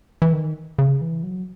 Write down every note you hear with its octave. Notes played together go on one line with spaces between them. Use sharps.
E3
D#3
C#3
E3
F#3